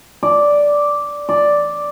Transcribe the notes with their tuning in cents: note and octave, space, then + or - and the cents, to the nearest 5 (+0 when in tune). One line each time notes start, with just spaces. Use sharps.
D5 -5
D5 +0